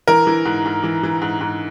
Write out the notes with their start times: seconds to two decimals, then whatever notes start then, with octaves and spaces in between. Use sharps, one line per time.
0.08 E3 A#4
0.27 E3
0.45 G#2
0.66 G#2
0.84 E3
1.03 E3
1.22 G#2
1.41 G#2